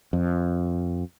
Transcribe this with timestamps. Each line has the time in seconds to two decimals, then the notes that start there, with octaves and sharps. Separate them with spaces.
0.13 F2